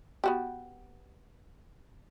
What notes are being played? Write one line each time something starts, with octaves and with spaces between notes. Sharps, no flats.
B3 F#4 G4